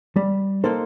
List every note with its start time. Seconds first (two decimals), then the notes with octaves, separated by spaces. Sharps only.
0.16 G3
0.64 A#3 D#4 A4 C5